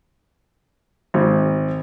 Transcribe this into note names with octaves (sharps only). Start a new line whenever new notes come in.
G#1